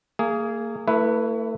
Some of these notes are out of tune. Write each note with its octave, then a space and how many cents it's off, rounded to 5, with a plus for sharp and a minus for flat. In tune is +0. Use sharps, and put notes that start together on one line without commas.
A#3 -30 G#4 +0
A3 +35 E4 +0 B4 +0